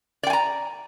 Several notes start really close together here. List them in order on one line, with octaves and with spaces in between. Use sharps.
D5 G5 G#5 A#5